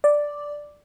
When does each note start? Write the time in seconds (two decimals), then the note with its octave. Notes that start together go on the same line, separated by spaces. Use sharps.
0.04 D5